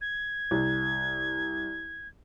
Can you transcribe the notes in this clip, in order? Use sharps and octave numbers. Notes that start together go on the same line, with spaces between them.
G#6
C2